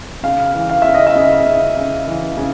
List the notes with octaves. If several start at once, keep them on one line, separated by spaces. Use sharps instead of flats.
C#3 F5
E3
F5
C#3 E5
D#5
E5
C#3
C#3
C#3
E3
C#3